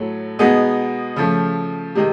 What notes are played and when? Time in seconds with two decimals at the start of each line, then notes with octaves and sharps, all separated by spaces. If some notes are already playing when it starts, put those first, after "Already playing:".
Already playing: A2 F#3 A3
0.39 B2 G#3 B3 D#4 G#4
1.16 C#3 F3 A3
1.95 C3 D#3 G#3